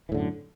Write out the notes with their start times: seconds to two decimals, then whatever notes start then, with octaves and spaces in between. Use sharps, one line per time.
0.09 E3
0.12 A2
0.15 D3
0.17 F#2